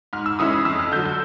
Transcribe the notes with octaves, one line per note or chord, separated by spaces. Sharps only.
G#2 F6
E6
E3 G#3 C#4 E4 D#6
D#6
F2 E6
F6
D3 F#3 G6
G6